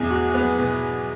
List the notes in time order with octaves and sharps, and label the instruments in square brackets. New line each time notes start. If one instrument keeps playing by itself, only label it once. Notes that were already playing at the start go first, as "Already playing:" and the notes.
Already playing: [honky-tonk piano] E2 B2 [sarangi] G#4
[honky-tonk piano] F#4
B3
B2